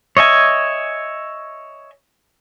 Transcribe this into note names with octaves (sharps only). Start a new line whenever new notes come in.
C#5 D#5 E5 G#5